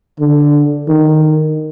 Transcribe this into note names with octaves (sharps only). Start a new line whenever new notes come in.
D3
D#3